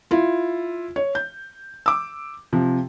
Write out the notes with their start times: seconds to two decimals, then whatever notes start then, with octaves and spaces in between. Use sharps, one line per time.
0.11 E4 F4
0.96 C#5
1.15 G6
1.86 D6 E6
2.53 C3 F3